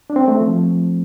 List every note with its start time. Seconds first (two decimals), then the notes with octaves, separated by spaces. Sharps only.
0.10 D4
0.16 C4
0.28 A3
0.41 F3